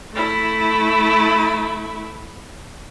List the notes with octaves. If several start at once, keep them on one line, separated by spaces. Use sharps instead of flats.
A3 E4